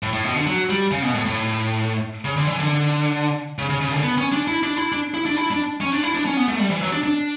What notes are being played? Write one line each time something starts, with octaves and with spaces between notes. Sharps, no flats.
A2
A2
B2
D3
F#3
G3
C#3
B2
A2
A2
C#3
D3
E3
D3
C#3
C#3
C#3
D3
B3
C#4
D4
E4
D4
E4
D4
E4
D4
E4
D4
C#4
D4
E4
D4
C#4
B3
A3
G3
E3
F#3
D4
D4